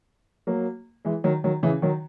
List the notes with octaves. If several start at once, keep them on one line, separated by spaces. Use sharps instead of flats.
F#3 A#3
E3 G#3
D#3 F#3
D#3 F#3
C#3 E3
D#3 F#3